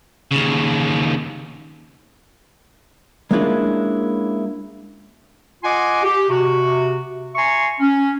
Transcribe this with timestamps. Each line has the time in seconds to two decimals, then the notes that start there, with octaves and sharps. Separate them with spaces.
0.32 D#2 C#3
3.31 G#3 A#3 C#4 D4 E4 F4
5.64 F4 D#5 F#5 G#5 C6 D6
6.03 G4
6.30 C3 F#4
7.35 E5 G#5 A#5 C6 C#6
7.80 C#4